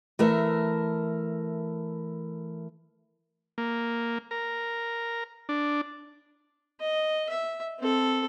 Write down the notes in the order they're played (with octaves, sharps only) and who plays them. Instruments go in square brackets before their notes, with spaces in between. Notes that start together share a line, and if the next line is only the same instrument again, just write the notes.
[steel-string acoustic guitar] E3 A3 A#4 E5
[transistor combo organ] A#3
A#4
D4
[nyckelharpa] D#5
E5
C4 A4